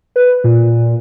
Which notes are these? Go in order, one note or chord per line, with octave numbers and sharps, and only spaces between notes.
B4
A#2